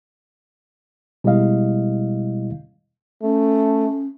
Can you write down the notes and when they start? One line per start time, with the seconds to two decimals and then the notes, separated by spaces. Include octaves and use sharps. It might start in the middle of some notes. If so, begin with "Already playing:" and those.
1.24 B2 G3 G#3 E4 D#5 F5
3.23 A3 C#4